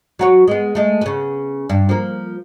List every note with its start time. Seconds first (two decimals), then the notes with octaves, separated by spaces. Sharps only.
0.19 F#3 F#4 C#5
0.48 G#3 B3
0.75 G#3 A3
1.01 C#3 B3
1.70 G2
1.89 F3 A#3